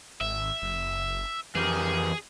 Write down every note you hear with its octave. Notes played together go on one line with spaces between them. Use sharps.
G#1 E5
F#1
F2 E3 G4 G#4 A#4